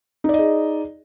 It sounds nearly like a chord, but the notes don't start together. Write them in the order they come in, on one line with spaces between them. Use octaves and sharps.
D#4 D5 D#5 G#4